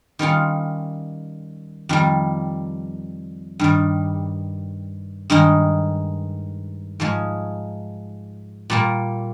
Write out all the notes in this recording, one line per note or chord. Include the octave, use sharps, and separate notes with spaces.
D#3 G3 C#4 F4
F2 D#3 G3
G2 D#3 G3
G2 D#3 G#3 D#4
G#2 F3 G#3
A#2 G3 A#3